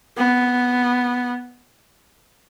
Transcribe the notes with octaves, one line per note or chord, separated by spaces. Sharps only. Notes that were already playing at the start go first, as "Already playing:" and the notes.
B3